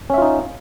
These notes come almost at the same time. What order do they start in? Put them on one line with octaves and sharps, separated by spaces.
C#4 E5 F4 D#4